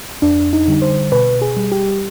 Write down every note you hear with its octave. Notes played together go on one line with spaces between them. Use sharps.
F2 D4
D#4
D3 G3
C5
B2 B4
G#4
G3
G4